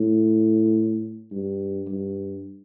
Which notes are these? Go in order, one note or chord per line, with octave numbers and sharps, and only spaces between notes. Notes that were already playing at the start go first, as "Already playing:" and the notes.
Already playing: A2
G2
G2